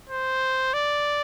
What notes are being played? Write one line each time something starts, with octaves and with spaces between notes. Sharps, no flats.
C5
D5